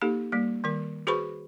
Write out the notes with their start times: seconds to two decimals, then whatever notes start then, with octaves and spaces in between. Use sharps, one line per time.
0.01 A#3 D#4 G4 A4
0.32 G3 A#3
0.64 D#3 G3 A#4
1.07 F#4 G#4 B4 C5 B5 C#6